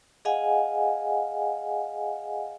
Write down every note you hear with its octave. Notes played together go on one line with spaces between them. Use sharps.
G#4 D#5 F5 F#5 G#5